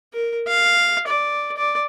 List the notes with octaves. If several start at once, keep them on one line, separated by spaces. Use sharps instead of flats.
A#4
F5
D5
D5